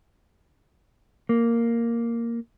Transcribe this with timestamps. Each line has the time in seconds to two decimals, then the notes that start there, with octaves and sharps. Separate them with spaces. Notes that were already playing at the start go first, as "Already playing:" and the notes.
1.29 A#3